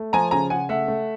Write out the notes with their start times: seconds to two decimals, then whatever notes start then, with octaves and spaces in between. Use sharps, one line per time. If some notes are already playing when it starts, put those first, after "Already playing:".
Already playing: A3
0.13 F3 G#5 A#5
0.31 C#3 G#5 A#5
0.50 C#3 F#5 G#5
0.69 A3 E5 F#5
0.88 A3